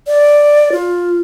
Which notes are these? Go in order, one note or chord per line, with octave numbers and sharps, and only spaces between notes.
D5
F4